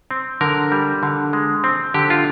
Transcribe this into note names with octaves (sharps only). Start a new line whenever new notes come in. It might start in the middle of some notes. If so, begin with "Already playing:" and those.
C4
D3 A#4
G3
D3
G#3
C4
D3 G4
F4